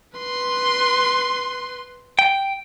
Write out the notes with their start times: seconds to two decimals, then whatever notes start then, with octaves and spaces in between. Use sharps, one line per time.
0.18 B4 C6
2.19 G5